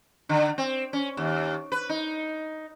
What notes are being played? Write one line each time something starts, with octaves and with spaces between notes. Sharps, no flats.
D3
C4
C#4
D#2
B4
D#4